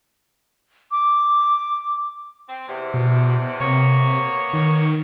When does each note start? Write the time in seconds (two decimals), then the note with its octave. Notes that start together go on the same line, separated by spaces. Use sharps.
0.91 D6
2.48 C4
2.68 E2 C3
2.94 B2
3.60 C3 A#3 B3 C#5
4.53 D#3